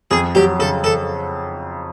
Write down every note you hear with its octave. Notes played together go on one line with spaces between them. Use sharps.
F2 G#4
F#3 G4
C#3 A4
A4